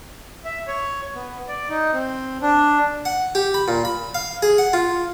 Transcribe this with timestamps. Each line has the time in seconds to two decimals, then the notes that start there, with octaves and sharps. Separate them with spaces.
0.45 E5
0.67 C#5
1.15 B3
1.48 D5
1.70 D#4
1.93 C4
2.42 D4
3.05 F#5
3.35 G4
3.54 B5
3.68 A#2
3.85 B5
4.15 F5
4.43 G#4
4.58 F#5
4.73 F4